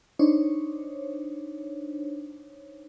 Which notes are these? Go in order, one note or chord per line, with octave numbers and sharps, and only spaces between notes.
D4 D#4 C5 C#5